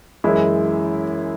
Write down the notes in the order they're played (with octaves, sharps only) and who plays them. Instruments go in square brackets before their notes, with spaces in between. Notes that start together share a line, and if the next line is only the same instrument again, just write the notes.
[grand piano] F#2 E3 G#3 E4